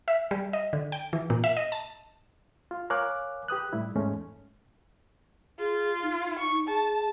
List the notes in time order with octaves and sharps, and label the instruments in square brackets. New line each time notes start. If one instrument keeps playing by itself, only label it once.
[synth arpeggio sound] E5
G3
D#5
D3
G5
E3
A#2
E5
D#5
A5
[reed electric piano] F4
A#4 C#5 F5 G#5 D6 F#6
G4 B4 D#6 F#6
A2 G3 E4
E2 G#2 G#3 A3 C#4
[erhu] F4 [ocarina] G#4
[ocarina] D#4
[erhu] C#6
[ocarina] G#4 [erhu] A5